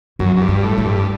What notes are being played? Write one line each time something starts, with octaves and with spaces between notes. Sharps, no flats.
F#2 F#3
F#2
G2
G3
A2
A3
G2